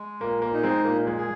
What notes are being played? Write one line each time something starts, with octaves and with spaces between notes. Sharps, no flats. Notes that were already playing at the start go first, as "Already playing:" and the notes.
Already playing: G#3
A#2 A#3
A#3
D#4
G#3 C4
A#2 A#3
G#3
G#4